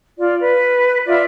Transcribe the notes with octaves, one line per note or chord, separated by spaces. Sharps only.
F4 D5
B4
F4 D5 E5